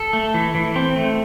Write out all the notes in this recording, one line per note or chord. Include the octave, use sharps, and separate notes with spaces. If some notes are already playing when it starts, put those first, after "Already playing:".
Already playing: A4
A3
E3
E3
C4
A3